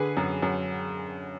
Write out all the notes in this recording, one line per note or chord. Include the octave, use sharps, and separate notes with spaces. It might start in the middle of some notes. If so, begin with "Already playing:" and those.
Already playing: D3 G#4 B4
F#2
F#2